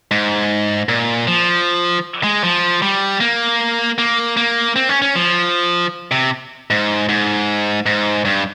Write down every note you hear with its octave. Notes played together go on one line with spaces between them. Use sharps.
G#2
A#2
F3
G#3
F3
G3
A#3
A#3
A#3
C4
C#4
C#4
F3
C3
G#2
G#2
G#2
G2